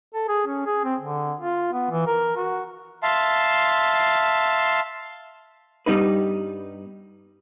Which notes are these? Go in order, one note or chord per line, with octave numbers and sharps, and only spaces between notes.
A4
G#4
C#4
G#4
C4
D3
F4
B3
E3
A#4
F#4
E5 F5 A5 C6
G2 G3 B3 D#4 B4